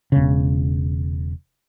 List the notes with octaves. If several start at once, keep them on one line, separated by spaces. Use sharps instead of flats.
E1 C#3